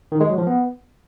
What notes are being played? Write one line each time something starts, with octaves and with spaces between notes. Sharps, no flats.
D#3
G#3
F#3
F3
B3